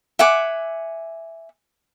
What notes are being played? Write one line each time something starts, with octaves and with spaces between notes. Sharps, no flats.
E5 F#5 G#5 D6